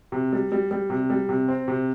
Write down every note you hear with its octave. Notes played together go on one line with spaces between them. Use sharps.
C3
G3
G3
G3
C3
G3
C3
C4
C3